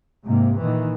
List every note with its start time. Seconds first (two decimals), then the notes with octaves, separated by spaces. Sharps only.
0.25 G#2 C3 A#3
0.61 A#2 D#3 E3